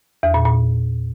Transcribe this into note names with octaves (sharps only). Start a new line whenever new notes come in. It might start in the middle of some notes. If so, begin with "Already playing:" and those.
E2
A#2
A#2